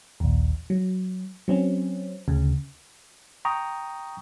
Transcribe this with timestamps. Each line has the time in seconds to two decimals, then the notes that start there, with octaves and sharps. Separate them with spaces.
0.20 A#1 D#2
0.70 F#3
1.48 F#3 C4 C#4
2.28 D2 C#3
3.45 G5 A#5 C#6 D#6